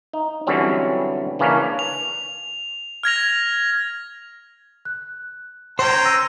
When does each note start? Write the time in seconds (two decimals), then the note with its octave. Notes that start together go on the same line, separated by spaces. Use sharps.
0.13 D#4
0.47 D3 E3 F#3 G3 C4 C#4
1.39 C#3 E3 A#3 C#4 D4
1.79 F7
3.03 F6 G#6 A#6 F7
4.85 F#6
5.79 C#4 C5 G5 A#5
6.05 E6 A#6 D#7